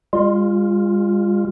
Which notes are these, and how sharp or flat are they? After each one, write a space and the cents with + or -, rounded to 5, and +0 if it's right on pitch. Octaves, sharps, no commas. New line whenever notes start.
G#3 -45 F4 +0